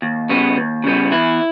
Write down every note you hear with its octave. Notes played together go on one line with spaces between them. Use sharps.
D#2
C#3 G3 B3
D#2
C#3 G3 B3
E2 E4